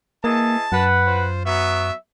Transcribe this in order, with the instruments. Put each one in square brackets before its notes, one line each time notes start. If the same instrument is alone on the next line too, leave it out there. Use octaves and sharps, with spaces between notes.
[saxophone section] E3 G#4 D#5 [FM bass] A#3 [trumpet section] A5
[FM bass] F#2 [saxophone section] B4 F#5
[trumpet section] F4 C5
[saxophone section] F#3 B3 [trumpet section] E5